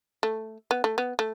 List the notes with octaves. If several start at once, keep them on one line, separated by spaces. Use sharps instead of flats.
A3
B3
A3
B3
A3